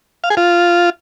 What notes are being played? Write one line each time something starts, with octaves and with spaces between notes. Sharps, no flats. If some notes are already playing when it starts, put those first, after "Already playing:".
F5
G#4
F4